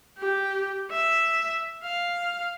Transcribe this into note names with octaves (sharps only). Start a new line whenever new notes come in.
G4
E5
F5